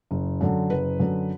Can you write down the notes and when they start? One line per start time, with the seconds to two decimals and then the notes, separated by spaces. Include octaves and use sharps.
0.11 F#1
0.41 F#2 D3
0.70 F#1 B4
1.00 F#2 D3